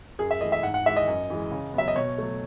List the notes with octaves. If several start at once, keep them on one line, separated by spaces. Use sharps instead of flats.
F#2 G#4
E5
E3 A3 D#5
E5
G#2 F#5
F#5
E3 G#3 E5
D#5
F#2
E3 G#3
C#3
F#3 B3 E5
D#5
B2 C#5
F#3 A3